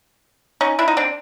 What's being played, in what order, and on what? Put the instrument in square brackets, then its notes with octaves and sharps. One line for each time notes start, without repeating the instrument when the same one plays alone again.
[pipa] C#4 D#4
D4 E4
D#4
C4 D4